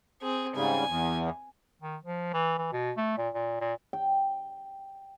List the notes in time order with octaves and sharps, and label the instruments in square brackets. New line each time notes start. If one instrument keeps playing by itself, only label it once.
[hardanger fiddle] C4 G#4
[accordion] G#2 C#3 G3 [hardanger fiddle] G#5
[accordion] E2
[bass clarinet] D#3
F3
E3
E3
B2
A3
A#2
A#2
A#2
[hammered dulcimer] G5